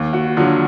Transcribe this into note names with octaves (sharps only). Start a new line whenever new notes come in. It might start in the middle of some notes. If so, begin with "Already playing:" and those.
Already playing: D#2
F#4
D3 F#3 F4